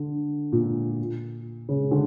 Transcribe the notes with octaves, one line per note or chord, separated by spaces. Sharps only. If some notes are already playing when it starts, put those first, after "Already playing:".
Already playing: D3
A#2
C#3
D3